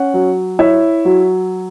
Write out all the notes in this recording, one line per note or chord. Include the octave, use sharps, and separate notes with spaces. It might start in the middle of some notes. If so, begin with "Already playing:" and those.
Already playing: C#4 F#5
F#3
E4 C#5 E5
F#3